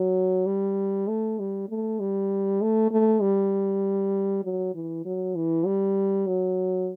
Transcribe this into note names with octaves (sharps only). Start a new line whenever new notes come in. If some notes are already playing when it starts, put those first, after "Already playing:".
Already playing: F#3
G3
A3
G3
A3
G3
A3
A3
G3
F#3
E3
F#3
E3
G3
F#3